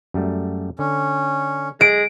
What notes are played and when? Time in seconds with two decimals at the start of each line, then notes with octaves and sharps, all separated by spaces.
0.14 F#2 G3 A3
0.79 D3 C#4
1.81 G#3 D7